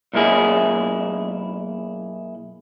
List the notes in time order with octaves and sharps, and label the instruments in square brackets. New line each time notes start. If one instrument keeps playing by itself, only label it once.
[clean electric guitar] B1 F#2 A#3 E4 G#4